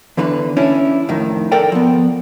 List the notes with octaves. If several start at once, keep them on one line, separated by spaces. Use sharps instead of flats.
E2 D3 E3 B4
C#4 D4 E4
F2 A2 D#3
A4 A#4 D5 G5
F3 B3